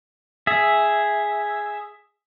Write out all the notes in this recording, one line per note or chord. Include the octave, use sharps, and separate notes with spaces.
G#4 E5